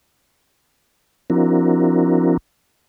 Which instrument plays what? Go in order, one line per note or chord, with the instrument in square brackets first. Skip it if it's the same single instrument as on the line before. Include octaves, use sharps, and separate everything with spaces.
[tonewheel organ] F3 C4 D4 E4 F#4 A#4